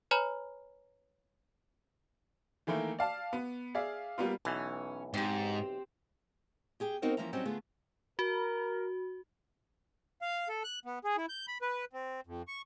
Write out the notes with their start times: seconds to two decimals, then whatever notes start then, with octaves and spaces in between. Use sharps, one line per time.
0.11 B4 C#5 G#5 A#5 B5 F6
2.67 D#3 E3 A3 A#3
2.99 D5 F5 A5
3.33 B3
3.75 G#4 D5 E5 F5
4.18 G3 A#3 B3 F4
4.45 B1 E3 C#4
5.14 G#2 C4 G4
6.80 G4 G#4 G5
7.02 B3 C4 D#4 F#4 A#4 C5
7.17 E3 F3 A#3 C#4 E5 A#5
7.33 F#3 G3 C4 C#4 D#4 F#4
7.45 D3 A3 B3 F4 G#4
8.19 F#4 A#4
10.22 F5
10.49 A4
10.64 F#6
10.85 B3
11.04 G#4
11.17 E4
11.29 G6
11.48 B5
11.62 B4
11.93 C4
12.27 F2
12.48 C#6